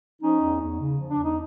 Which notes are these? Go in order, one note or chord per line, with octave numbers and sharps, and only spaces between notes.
F3 C#4 D#4
E2
E2
C#3
F3
D4
E2
D#4